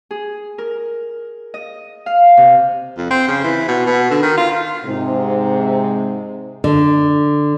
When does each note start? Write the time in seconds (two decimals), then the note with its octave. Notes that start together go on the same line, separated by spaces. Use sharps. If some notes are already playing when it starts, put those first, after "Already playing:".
0.11 G#4
0.58 A#4
1.54 D#5
2.06 F5
2.37 C3
2.97 F2
3.10 C4
3.28 C#3
3.44 E3
3.68 B2
3.86 B2
4.11 D3
4.22 D#3
4.37 F4
4.85 G#2 C3
6.64 D3